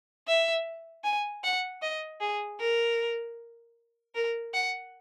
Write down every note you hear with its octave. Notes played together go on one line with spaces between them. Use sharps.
E5
G#5
F#5
D#5
G#4
A#4
A#4
F#5